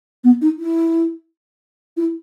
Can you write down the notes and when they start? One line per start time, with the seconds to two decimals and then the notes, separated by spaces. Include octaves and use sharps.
0.24 B3
0.42 D#4
0.59 E4
1.97 E4